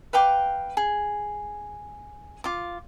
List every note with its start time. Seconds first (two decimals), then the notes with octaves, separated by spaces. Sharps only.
0.13 B4 F5 G5 D6
0.77 G#4
2.44 F4 D6